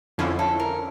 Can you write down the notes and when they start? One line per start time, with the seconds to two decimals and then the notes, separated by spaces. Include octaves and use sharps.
0.18 F2 D3 F3 C#4 E4 F4
0.39 A4
0.60 A#4